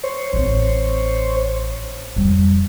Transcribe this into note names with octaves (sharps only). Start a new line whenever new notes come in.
C5 C#5
A1 C4
F2 G3